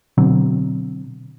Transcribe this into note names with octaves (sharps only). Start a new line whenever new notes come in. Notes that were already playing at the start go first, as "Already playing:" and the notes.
B2 D3 F#3 C4